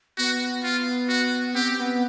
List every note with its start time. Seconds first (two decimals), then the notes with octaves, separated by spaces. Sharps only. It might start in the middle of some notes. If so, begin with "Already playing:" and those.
0.18 B3 F#4
0.63 F4
1.09 F#4
1.55 C4 G4
1.78 B3